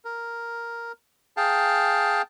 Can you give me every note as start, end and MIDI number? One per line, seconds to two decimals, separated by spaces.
0.05 0.92 70
1.37 2.22 68
1.37 2.22 77
1.37 2.22 79
1.37 2.22 81